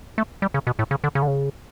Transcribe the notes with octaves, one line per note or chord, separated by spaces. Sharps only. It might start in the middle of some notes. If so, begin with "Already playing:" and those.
A3
G3
C#3
B2
A2
C#3
D3
C#3
D3
C#3